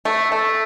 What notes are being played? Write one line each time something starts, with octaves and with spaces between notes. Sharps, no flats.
A3
A3